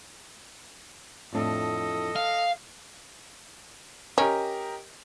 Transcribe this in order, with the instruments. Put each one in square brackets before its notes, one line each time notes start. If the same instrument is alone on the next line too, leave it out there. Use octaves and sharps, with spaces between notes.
[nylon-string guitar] F2 A2 D4 [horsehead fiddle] A4 D#5
[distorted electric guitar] F5
[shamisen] C#4 [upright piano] G4 A#4 D#5